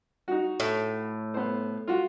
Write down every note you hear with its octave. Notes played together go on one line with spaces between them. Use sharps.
D#4 F#4
A2
B3 C5
F4 F#4